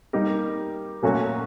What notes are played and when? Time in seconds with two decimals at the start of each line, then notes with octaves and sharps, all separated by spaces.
0.13 G3 A#3 D#4 G4 A#4
1.03 A#2 F#3 A3 C#4 F#4